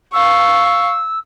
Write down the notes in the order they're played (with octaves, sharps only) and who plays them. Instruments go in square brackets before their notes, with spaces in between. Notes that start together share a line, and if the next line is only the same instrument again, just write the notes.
[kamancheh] F5 C#6 [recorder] E6